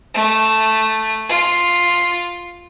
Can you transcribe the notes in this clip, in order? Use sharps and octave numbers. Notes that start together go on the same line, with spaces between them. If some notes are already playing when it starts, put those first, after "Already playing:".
A3
F4